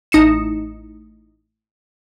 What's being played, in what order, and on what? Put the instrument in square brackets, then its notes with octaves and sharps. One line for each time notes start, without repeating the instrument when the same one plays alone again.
[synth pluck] A1 D#4 C#7 E7